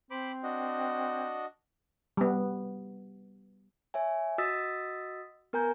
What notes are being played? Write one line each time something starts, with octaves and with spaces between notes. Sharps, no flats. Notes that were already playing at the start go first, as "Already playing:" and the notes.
C4 C5 B5 D6
D4 F#4 D#5
G3 B3
C#5 E5 G#5
F#4 D#5 D#6 E6 A6 B6
B3 A#4 G#5 A#5 G6